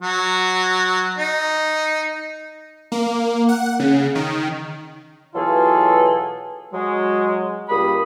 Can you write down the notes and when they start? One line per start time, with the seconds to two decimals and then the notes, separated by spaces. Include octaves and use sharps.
0.02 F#3
1.19 D#4
2.92 A#3
3.49 F#5
3.80 C#3
4.15 D#3
5.34 B2 E3 F#3 F4 G#4 A4
6.72 F#3 G#3
7.69 C#2 G3 A#3 B5 D#6